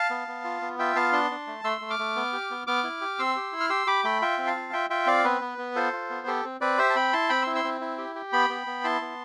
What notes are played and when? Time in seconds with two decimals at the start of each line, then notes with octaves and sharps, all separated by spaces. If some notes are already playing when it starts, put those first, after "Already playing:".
Already playing: F5 A5
0.10 B3
0.28 B3
0.44 F4
0.62 B3
0.79 F4 E5 G5
0.96 B3 F5 A5
1.13 D4 A5 C6
1.31 D4
1.47 A3
1.64 A3 C6 E6
1.81 A3
1.90 D6 F6
1.99 A3
2.16 B3
2.33 G4
2.51 B3
2.67 B3 D6 F6
2.84 E4
3.01 G4
3.19 C4 C6 E6
3.36 G4
3.52 E4
3.60 F6
3.70 G4 C6 E6
3.87 G4 B5 D6
4.04 A3 G5 B5
4.22 F4 E5 G5
4.38 C4
4.47 F5 A5
4.56 F4
4.73 F4 E5 G5
4.90 F4 E5 G5
5.07 C4 D5 F5
5.24 B3 B4
5.41 B3
5.58 B3
5.75 F4 A4 C5
5.93 F4
6.10 B3
6.27 G4 A4
6.45 C4
6.61 C4 B4 D5
6.78 G4 C5 E5
6.90 A5
6.96 C4 G5 B5
7.13 E4 A5 C6
7.29 C4 G5 B5
7.42 E4 C6 E6
7.55 C6 E6
7.64 C4
7.81 E4
7.98 G4
8.15 G4
8.33 B3 G5 B5
8.49 B3
8.67 B3
8.84 E4 A5 C6
9.01 B3